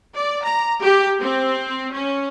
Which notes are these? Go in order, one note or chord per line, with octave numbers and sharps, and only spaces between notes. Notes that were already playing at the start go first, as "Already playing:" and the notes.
D5
A#5
G4
C4
C#4